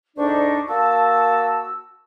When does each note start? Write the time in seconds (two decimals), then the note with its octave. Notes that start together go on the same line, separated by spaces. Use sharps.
0.16 D2 G#2 D4 D#4 D5 C#6
0.68 A#3 F#4 A5 E6